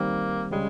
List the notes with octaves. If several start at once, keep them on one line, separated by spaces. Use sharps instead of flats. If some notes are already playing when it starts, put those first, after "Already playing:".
Already playing: D#3 G3 A#3 C4
C#3 G3 G#3 C#4 G#4